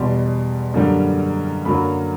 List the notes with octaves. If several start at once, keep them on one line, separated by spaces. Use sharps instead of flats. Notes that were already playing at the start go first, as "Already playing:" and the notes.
Already playing: E2 B2 G3 C6
F#2 D3 G3 A#3
F#2 D3 F#3 A#3 B5